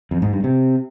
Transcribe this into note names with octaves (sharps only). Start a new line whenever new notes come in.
F2
G#2
G2
C3